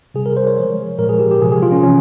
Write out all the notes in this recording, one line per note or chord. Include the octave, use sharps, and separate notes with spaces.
C3 G3 G#4
A#4
C5
C#5
C#3 F3 G#3
A#2 F3 G#3 A#4
G#4
G4
G4
C3 F3 G#3 G#4
G#4
F4
C#4
C3 E3 C#4